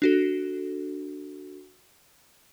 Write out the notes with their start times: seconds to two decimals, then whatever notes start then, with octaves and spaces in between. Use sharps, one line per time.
0.02 D4 F#4 A4